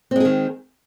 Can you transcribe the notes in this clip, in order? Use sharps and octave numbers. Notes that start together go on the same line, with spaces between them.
D#3 G#3 C4 G#4